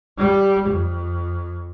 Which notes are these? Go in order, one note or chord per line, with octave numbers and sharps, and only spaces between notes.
G3
F2